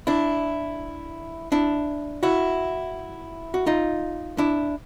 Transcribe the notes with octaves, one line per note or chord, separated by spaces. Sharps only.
D4 E4
D4 E4
E4 F#4
F#4
D#4 F4
D4 E4